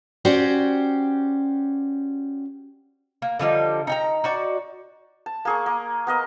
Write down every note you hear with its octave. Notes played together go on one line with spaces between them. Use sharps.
C#4 F#4 G4 C5 D5
A#3
D3 F3 G3 D#4
D#4 G5 A#5
D#4 F#4 D5
A5
A#3 G#4 C#6
A#3
B3 A#4 D#5